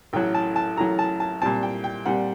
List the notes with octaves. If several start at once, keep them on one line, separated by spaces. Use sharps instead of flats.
A1 A2 F#3 G5
A5
A5
A1 A2 F#3 A#5
A5
A5
A#2 G3 C4 A5
G5
G5
A#2 G3 C4 F#5